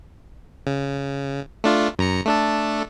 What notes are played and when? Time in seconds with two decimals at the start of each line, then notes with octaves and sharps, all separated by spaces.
0.67 C#3
1.64 A3 D4 F4
1.99 F#2 A#5 C#7
2.26 A3 D4 A4